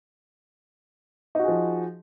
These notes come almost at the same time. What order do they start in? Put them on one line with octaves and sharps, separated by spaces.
D#4 F#4 G#4 F3